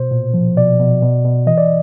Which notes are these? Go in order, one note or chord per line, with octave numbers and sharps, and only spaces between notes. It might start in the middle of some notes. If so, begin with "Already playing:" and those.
Already playing: B2 C5
A#2
F3
B2 D5
B2
B2
B2
E3 D#5
D5